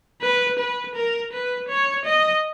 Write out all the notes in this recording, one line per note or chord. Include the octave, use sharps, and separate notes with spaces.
B4
B4
A#4
B4
C#5
D#5